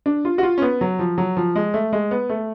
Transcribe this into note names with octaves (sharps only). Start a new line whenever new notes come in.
D4
F4
F#4
F4
C#4
B3
F#3
F3
F#3
F3
G#3
A3
G#3
B3
A3